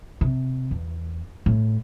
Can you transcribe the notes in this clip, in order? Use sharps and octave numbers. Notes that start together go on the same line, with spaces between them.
C3
E2
A2